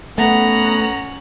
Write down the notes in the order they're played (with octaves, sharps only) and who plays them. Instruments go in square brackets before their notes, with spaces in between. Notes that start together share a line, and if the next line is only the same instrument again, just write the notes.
[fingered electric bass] A3 [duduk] B3 [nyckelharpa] C#4 F#5 [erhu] A#5